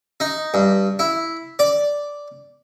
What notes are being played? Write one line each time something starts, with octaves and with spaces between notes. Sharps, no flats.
D#4
G2
E4
D5